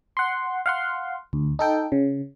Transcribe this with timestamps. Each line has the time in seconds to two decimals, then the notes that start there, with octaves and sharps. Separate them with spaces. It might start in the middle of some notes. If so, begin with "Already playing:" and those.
0.17 F#5 C6
0.66 F5 F#5 C6
1.33 D2
1.59 D#4 A4 G5
1.92 C#3